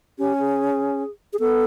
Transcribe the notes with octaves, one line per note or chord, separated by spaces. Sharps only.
C#4 G4
G#4
G#4
B3 A4